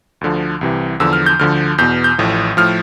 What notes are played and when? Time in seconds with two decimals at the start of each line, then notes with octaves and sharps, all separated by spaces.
0.21 D2 D3 F3
0.61 C2 C3 E3
1.00 E2 D3 F3 E6
1.13 F6
1.26 G6
1.39 D2 D3 F3 F6
1.78 E2 B2 G6
2.04 G6
2.18 A1 A2 F3
2.57 A2 F3 F6